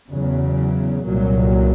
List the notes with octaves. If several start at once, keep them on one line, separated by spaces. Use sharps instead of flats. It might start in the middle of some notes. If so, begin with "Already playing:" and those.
E2 C#3 F#3
C2 A#2 F#3